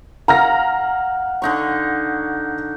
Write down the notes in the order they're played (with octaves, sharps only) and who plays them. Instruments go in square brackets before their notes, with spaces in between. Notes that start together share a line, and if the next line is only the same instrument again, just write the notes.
[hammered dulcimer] F5 F#5 [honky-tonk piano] A#5 F6 A#6
[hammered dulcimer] D3 D#4 C#6